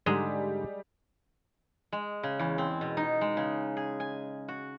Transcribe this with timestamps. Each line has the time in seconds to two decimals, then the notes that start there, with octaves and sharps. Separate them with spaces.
0.06 G#2 D3 G3 G#3 A#5
1.92 G#3
2.23 C#3
2.39 E2
2.58 C4
2.81 B2
2.97 D#4
3.21 G#3
3.37 C#3
3.77 G#4
4.00 G#5
4.48 F#4